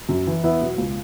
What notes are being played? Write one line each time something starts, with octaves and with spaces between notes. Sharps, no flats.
F#2
E3
E2 B3 E4
B2 F#3
C#2